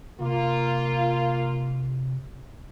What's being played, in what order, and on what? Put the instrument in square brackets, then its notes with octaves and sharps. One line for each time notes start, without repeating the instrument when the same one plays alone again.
[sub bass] C3 [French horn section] A#3 F4